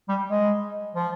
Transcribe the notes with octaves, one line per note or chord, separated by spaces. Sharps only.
G3
G#3
F3